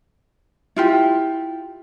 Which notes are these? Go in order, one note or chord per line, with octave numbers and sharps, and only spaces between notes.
E4 F4 G4